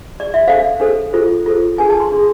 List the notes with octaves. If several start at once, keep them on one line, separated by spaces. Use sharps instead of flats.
D5
E5
D4 A4 C5 F5
D4 A4 C5
F4 A4 C5
F4 A4 C5
D4 G#4 B4 G#5
A5
C6
D4 G#4 B4